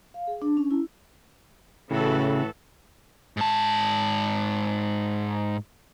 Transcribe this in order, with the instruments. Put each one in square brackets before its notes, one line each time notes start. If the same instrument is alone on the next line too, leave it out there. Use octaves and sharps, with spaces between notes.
[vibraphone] F5
G#4
D4
C#4
E4
[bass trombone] A2 [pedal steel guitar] C#3 [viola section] E3 F#4 A4
[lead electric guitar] G#2 A5